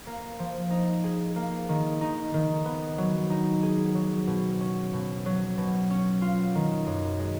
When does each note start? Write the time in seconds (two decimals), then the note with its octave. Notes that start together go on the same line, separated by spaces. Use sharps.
0.07 A#3
0.39 F3
0.70 D#4
1.04 G#4
1.36 A#3
1.69 D#3
2.01 D#4
2.34 D#3
2.65 B3
2.98 F#3
3.30 D#4
3.63 G#4
3.95 F#3
4.27 B2
4.61 C#4
4.93 B2
5.26 F#3
5.58 B2
5.90 C#4
6.22 F4
6.55 D#3
6.87 F#2
7.20 G#3